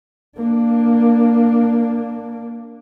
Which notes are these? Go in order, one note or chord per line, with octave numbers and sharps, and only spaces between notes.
A#3 D4